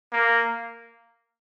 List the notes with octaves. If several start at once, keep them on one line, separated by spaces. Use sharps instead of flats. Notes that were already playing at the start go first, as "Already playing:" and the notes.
A#3